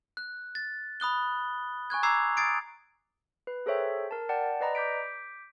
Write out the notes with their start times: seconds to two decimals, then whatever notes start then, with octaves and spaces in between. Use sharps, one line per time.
0.17 F#6
0.55 A6
1.00 B5 D#6 F#6 G7
1.90 G#5 C#6 F#6 G#6
2.03 A#5 D6 E6 G#6 C7 F7
2.37 D#6 G#6 A6 C7 D7
3.47 B4
3.66 G#4 A4 C5 C#5 E5 G5
4.11 A#4 A5
4.29 D5 F#5 G5 A5
4.61 B4 D5 D#5 A#5 B5
4.75 D6 G6 B6 D7